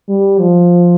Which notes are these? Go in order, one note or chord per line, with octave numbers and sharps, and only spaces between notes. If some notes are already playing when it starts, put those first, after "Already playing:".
G3
F3